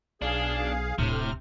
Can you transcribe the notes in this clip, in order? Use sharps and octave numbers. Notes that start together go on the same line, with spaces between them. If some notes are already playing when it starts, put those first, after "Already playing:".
B1 D4 G#4 F5
D1 A2 C3 F6